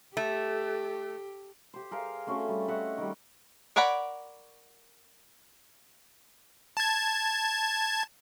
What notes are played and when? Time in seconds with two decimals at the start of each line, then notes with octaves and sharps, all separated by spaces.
0.17 A3 G4
1.74 G4 C5
1.91 G#4 A#4 C5 F5
2.27 A3 C4 C#4 F#4
2.49 G3
2.68 D#5 E5 F#5
2.98 D#3 G3
3.76 A#4 C#5 D5 F#5 B5
6.77 A5 G#6